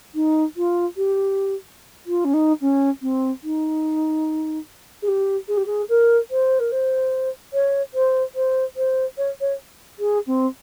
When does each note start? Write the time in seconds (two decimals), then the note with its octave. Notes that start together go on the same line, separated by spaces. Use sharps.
0.15 D#4
0.56 F4
0.97 G4
2.06 F4
2.24 C#4
2.33 D#4
2.61 C#4
3.02 C4
3.43 D#4
5.02 G#4
5.08 G4
5.48 G#4
5.57 G4
5.66 G#4
5.89 A#4
6.30 C5
6.59 A#4
6.71 C5
7.53 C#5
7.94 C5
8.35 C5
8.76 C5
9.17 C#5
9.41 C#5
9.99 G#4
10.27 C4